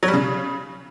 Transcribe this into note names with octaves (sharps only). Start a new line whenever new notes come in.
F#3
G3
C#3